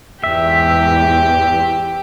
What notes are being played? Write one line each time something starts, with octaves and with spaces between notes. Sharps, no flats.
E2 G#2 G4 E5